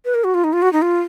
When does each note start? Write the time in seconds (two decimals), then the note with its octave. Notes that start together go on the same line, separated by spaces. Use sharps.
0.05 B4
0.15 A#4
0.24 F#4
0.34 F4
0.44 D#4
0.53 F4
0.62 F#4
0.73 D#4
0.82 F4